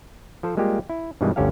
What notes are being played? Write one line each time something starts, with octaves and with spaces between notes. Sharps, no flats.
F3 A4 C5
G3 G#3 A#3 F4 G4
E4
G2 B2 D#3 E3 G3 G#3
G1 D2 C#4 G4 A4 F5